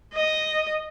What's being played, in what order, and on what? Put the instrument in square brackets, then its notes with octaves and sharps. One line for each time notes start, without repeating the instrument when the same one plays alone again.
[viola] D#5